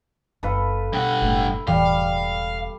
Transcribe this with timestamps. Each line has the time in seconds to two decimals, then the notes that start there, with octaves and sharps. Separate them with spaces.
0.43 F#1 A4 B4 F5
0.93 G2 B2 F#5
1.22 F#1 A2
1.67 E1 A2 E3 G3 F5